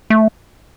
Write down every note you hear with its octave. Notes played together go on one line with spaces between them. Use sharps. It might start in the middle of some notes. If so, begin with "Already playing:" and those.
A3